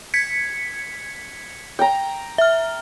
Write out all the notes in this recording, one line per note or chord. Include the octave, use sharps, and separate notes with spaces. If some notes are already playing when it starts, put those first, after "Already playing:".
G#6 B6 C#7
G5 A#5
E5 F6